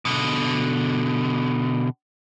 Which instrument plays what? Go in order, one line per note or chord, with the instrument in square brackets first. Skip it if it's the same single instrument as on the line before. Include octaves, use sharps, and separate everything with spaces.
[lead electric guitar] B2 D3